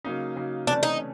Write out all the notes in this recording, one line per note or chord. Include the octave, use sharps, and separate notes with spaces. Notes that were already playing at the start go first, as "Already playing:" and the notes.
C#3 F#3 A#3 D#4
C#3 F#3 A#3 D#4
C3 E3 A3 C#4 D4
D#4
C#4